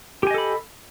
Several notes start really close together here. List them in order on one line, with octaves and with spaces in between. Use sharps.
G4 G#5 D#5 A4 B5